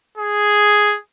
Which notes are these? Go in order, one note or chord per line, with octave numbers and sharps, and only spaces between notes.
G#4